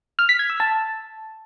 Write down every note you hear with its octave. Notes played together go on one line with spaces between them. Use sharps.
F6
B6
G#6
E6
A5